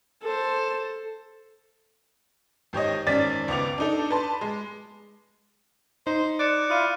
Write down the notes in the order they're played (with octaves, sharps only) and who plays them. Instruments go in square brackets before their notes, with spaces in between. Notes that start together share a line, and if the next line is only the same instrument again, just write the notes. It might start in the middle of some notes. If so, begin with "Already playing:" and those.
[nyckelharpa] A4 C5
[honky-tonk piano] G#1 G4 C#5 D#5
G#1 C#4 D5 A6 B6
C#2 B3 D6 F7
D4 D#4 A4
B4 A5 C6
G#3
[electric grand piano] D#4 [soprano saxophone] C5
[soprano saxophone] D5 [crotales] F#6 C#7 E7
[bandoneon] E4 F4 [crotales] D#6 F6 D#7